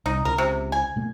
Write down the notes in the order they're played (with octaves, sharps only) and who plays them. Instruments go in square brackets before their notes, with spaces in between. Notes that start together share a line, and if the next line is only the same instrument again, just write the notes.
[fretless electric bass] C2 [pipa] D#4
[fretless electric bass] C#2 C#3 [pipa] A#4
[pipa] C3
G#5
[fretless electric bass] B2 A3 A#3